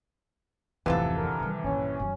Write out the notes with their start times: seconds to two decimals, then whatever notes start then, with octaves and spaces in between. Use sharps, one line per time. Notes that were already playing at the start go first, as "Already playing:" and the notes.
0.86 D1 F2 C3 E3 B3 F4 A4
1.17 D3 A#4
1.39 D#3 G3
1.64 A#1 G2 C#4
1.99 F#2 D#3